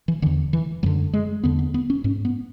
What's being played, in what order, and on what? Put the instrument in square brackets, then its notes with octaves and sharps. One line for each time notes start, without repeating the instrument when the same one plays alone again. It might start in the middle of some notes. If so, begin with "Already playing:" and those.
[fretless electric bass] E3
E2 D3 E3
E3
F#2 D3 F#3
G#3
E2 D3 B3
B3
B3
C#4
G#2 C#4
B3